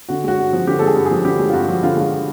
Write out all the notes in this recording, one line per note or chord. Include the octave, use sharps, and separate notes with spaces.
D3 F#4
G#3 F#4
G2
F3
D3 G4
A4
G#3 G#4
G2
G#4
F3
D3 G4
G#3
F4
G2 F#4
F3
D3 F4
G#3 F4